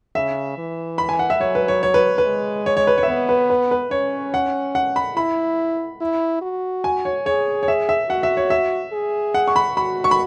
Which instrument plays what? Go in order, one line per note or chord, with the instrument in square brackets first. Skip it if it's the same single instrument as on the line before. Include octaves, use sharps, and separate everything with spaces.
[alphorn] C#3 [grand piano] E5
[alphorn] E3
[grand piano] B5
G#5
F#5
E5
[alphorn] F#3 [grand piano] C#5
[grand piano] B4
C#5
C#5
B4
B4
[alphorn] G#3
[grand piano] C#5
C#5
B4
C#5
E5
[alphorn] B3 [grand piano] C#5
[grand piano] B4
B4
B4
[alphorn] C#4 [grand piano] C#5
[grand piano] F#5
F#5
B5
[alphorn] E4 [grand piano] B5
[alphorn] E4
F#4
[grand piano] G#5
C#5
[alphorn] G#4 [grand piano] C#5
[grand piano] C#5
E5
E5
[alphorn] F#4 [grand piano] F#5
[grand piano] E5
C#5
E5
[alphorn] G#4
[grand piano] F#5
C#6
B5
[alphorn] F#4 [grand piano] B5
[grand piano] C#6
B5